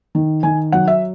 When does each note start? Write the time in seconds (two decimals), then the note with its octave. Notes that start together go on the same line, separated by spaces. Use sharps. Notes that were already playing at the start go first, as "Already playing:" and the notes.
0.15 D#3
0.43 D#3 G#5
0.72 F#3 F#5
0.88 E5